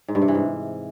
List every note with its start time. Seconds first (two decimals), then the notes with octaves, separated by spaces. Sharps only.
0.08 G#2
0.15 G2
0.22 C3
0.28 E3
0.35 G#2